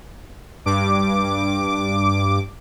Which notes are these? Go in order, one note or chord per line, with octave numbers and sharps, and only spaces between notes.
G2 D6